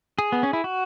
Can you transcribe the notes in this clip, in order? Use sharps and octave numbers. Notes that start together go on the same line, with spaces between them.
G#4
B3
C#4
E4
F#4